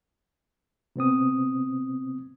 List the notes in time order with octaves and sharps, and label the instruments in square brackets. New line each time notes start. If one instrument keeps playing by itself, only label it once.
[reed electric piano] C3 B3 C4 D#6